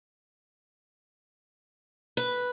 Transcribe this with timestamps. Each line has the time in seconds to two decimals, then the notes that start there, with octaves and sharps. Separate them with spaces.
2.17 B4